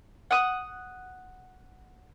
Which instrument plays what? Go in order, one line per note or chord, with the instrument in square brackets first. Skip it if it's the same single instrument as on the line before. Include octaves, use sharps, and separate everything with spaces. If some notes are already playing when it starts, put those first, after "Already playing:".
[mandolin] F#5 D#6